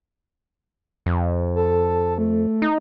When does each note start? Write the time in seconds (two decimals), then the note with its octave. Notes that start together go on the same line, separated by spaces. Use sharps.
1.06 F2
1.56 A4
2.18 A3
2.62 D#4